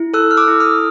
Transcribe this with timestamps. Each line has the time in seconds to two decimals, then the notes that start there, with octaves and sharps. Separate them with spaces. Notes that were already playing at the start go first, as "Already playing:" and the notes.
Already playing: E4
0.14 A4 E6 F#6
0.31 F6
0.37 D6 E6
0.48 E4
0.60 D#6 F6